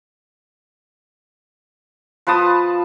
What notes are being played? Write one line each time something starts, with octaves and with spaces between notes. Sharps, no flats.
F3 B4 A5 D#6